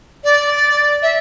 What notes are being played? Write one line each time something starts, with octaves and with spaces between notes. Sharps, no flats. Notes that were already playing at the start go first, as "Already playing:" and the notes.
D5
E5